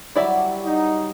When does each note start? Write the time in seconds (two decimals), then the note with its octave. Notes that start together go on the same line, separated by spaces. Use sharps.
0.16 F#3 G3 E4 D5 E5
0.64 D#4